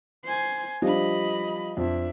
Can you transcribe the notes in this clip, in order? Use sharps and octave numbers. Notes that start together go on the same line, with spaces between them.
C5 G#5
F3 G3 D4 D#5 B5
F2 D4 E5